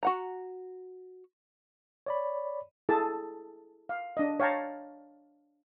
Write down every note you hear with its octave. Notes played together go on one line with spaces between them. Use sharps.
F#4 F#5 A#5
C#5 D5 B5
E4 G#4 A4 A5
F5
D4 D#5
C#5 F5 G5 A5 A#5